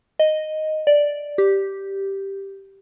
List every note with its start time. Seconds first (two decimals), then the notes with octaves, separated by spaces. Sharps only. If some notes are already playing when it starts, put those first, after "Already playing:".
0.19 D#5
0.87 D5
1.38 G4